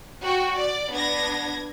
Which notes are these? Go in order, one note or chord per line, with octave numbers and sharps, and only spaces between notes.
F#4 G5
D5
B3 D4 G#6 A#6